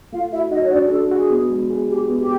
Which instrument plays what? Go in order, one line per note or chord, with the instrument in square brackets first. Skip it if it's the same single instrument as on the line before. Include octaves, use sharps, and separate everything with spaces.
[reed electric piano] A3 [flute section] F4 F5
[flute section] E4 E5 [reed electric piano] F#4
[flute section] D#4 D#5 [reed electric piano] F#4
[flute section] C#5
[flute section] D4 D5 [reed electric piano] F#4
[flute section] G#4
[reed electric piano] D4 [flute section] A4
[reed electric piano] F#4 [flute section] G#4
[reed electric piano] B3
G#3
G#4
[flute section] G4 [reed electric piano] G#4
[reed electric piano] B3
[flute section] G4